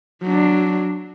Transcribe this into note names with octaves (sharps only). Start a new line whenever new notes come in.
F#3 D4